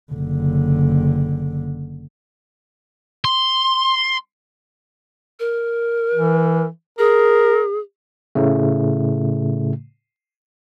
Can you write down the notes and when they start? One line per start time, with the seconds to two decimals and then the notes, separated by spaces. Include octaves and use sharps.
0.13 F#1 D3
3.25 C6
5.40 A#4
6.14 E3
6.98 G#4 A#4
8.35 A2 C#3 A3